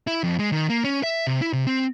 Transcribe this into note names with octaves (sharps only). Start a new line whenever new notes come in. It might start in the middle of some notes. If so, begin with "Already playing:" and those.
E4
F2
G#3
D#3
A#3
C#4
E5
C3
E4
C3
C4